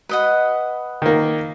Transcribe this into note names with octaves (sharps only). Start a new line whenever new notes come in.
B4 D#5 F#5
D#3 A#3